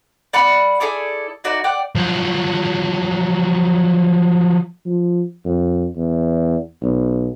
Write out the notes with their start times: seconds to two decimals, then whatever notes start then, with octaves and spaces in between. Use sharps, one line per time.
0.33 D5 F#5 B5
0.80 E4 G#4 A4 D5
1.44 D#4 E4 F#4 D5
1.64 D5 F#5 G5
1.96 F3 F#3
4.85 F3
5.45 F2
5.96 E2
6.82 B1